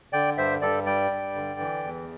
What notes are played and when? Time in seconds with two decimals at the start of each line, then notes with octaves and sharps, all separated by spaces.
0.13 D3 D5 G5
0.37 G2 C5 E5
0.61 G2 A4 D5
0.86 G3 D5 G5
1.11 G2
1.35 D3
1.60 E3
1.84 E2